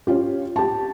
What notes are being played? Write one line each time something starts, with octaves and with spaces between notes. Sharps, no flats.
C#4 F4 G4
G4 A5